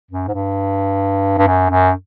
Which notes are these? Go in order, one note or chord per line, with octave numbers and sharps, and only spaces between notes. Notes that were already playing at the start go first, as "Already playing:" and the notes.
F#2
G#2
G2
G2
F#2
F#2